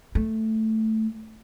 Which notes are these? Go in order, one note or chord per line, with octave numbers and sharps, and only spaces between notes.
A3